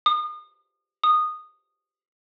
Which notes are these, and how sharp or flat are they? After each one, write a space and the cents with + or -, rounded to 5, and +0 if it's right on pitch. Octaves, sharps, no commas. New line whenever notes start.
D#6 -35
D#6 -15